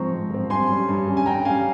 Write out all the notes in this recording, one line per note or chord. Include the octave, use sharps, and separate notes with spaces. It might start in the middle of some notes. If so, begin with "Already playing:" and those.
Already playing: G#2 F3 C4 A#5 C#6
G#2
F3 C4
G2 G#5 C6
G3 C#4
G2
G3 C#4
G#5
G2 G5 A#5
G3 C#4 F5 G#5